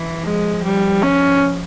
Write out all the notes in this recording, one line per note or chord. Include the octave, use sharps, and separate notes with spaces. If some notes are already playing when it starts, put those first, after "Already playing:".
Already playing: E3
F3 G#3
G3
C#4